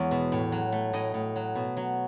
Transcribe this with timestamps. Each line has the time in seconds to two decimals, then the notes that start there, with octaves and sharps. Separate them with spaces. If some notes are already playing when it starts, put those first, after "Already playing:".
Already playing: E2 G#3 C#5
0.11 B2
0.32 A2
0.52 F#3
0.72 A3
0.93 A2 D#5
1.14 A2
1.36 F#3
1.55 B2
1.77 F#3